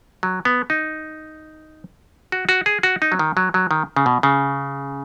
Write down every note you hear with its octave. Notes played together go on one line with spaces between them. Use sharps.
F#3
B3
D#4
F#4
F#4
G#4
F#4
D#4
F#3
D#3
F#3
F#3
D#3
C#3
B2
C#3